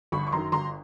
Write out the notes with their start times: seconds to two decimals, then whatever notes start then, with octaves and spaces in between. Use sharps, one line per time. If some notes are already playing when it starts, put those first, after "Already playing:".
0.12 G1 B5 C#6
0.27 C#6
0.32 F#2 D#3 A#5 C6
0.52 G1 A#5 C6